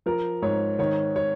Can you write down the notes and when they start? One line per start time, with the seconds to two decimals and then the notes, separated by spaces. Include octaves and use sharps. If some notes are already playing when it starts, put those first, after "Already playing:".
0.06 F3 A#4
0.42 G#2 C#5
0.79 D#3 C#5
1.16 C#5